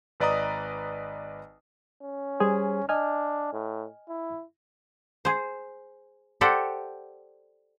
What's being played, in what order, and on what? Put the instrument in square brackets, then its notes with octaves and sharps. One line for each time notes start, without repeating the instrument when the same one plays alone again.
[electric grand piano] G#1 B4 D5 D#5 A#5 D#6
[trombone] C#4
[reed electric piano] G3 G#4 C5
[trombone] D4 [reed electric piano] D#5 G#5 F6
[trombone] A2
E4
[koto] G#4 C5
G4 A4 C5 D5 F#5 G5